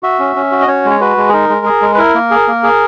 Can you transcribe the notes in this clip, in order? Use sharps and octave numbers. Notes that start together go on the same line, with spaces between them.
F#4 E5
C#4
C#4
F#4
D#5
C#4 C#5
G#3
C#5
F#4 B4
G#3
G#4
D#4 A#4
G#3
G#4
G#3
B4
E4 A#4
A#3
G#4
A#3
G#4